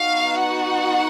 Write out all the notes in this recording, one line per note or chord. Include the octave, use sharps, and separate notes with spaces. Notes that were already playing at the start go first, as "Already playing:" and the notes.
Already playing: B3 D#4 F#4 F5
F#5